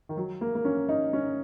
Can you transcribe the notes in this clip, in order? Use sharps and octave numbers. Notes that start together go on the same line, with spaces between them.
D#3
F#3
A#3
A#3
C#4
D#4
C#4